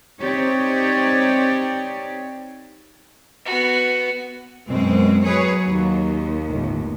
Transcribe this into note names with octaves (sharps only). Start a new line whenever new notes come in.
C4 D#4 G4 C#5 D5
B3 F#4
F#2 B2 G#3 C4
F#3 G#4 B4 C#5
D#2
G1 A2